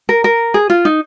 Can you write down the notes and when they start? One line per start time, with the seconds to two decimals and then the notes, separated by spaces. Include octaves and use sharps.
0.09 A#4
0.24 A#4
0.54 G#4
0.70 F4
0.85 D#4